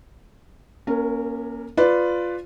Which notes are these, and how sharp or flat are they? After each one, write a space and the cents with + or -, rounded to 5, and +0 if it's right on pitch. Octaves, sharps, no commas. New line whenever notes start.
A#3 +25 C#4 +0 A#4 -30
F4 +0 B4 +10 D5 +0